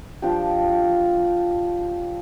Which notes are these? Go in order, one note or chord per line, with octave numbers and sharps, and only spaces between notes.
F3 D4 G4